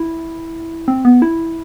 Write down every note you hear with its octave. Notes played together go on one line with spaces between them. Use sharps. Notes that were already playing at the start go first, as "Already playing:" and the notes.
Already playing: E4
C4
B3
E4